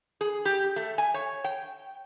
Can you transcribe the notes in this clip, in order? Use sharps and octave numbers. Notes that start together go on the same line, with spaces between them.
G#4
G4
A3
G#5
C#5
G5